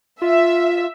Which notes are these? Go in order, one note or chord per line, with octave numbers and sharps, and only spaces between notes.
F4 E5